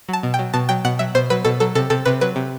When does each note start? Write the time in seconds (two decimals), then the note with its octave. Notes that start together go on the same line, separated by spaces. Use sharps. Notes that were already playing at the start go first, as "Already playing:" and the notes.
0.09 F#3 A5
0.23 B2
0.34 G5
0.39 F#3
0.53 B2 A5
0.69 F#3 G5
0.85 B2 F#5
0.99 F#3 E5
1.15 B2 C5
1.30 F#3 B4
1.45 B2 A4
1.60 F#3 A4
1.75 C3 A4
1.90 C3 A4
2.05 C3 B4
2.21 F#3 B4
2.36 C3